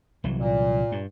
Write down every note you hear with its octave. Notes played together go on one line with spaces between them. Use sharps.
C2 E3 F#3
A#2
G2